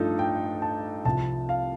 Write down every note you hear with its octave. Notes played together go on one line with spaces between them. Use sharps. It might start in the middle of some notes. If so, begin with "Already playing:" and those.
Already playing: G2 F3 A3 D4 D#4 F4 A4
G5
A5
C2 C3 F3 A5
F5